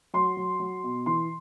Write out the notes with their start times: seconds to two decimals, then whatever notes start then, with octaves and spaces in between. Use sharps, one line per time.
0.14 F#3 C6
0.37 F#3
0.60 F#3
0.84 B2
1.06 E3 C6